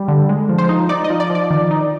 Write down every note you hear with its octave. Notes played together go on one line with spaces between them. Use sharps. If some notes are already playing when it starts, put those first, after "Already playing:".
Already playing: G3
D3
G#3
F3
C5
D#4
D#4 D5
D#5
F3
D5
F3
D5
D#3
D#4